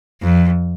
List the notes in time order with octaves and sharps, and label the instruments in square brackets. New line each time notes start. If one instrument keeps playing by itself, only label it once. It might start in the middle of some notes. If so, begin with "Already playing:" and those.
[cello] F2